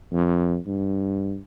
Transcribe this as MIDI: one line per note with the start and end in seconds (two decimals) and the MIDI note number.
0.12 0.58 41
0.67 1.38 43